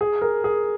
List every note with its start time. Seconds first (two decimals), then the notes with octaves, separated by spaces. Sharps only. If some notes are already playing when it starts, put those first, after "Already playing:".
0.01 G#4
0.22 A#4
0.44 G#4